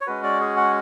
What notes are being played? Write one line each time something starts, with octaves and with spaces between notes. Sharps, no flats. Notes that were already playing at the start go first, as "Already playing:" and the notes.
C#5
G#3 C#4 F#4 B4
D5
G#4
F#5